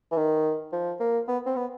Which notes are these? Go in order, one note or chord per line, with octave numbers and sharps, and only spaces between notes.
E3
D#3
F3
A#3
B3
C4
B3